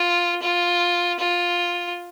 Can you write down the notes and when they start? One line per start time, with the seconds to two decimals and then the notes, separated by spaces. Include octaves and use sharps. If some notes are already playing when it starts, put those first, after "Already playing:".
Already playing: F4
0.42 F4
1.19 F4